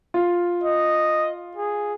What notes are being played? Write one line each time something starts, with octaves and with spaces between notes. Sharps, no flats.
F4
D#5
G#4